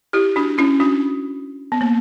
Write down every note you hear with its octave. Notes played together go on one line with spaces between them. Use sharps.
E4 G4
D4 F#4
C#4 E4
D4 F#4
B3
A#3